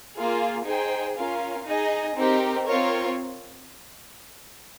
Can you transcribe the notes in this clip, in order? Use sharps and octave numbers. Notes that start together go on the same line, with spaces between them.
A#3 F4 G#4
D#4 G#4 C5 G5
C#4 F4 A#4 F5
D#4 G#4 D#5
C4 D#4 G4 A#4
C4 F4 A#4 C#5